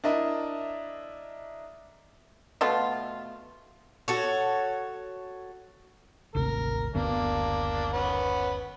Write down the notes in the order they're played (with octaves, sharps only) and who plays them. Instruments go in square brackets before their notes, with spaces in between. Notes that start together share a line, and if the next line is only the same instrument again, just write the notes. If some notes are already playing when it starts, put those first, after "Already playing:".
[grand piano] D4 E4 A#4 D#5 E5
[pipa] B2 A3 F4
[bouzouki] F#4 A4 C#5
[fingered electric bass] G#1 D2 C3 [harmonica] A#4
[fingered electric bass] F#1 D2 B3 [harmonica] A#3 D4
[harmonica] C#4 B4 F#5